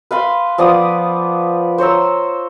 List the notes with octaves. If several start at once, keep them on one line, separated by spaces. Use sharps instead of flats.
B4 F5 B5 C6
F3 B3 D5 D#6
C5 C#5 A#5 E6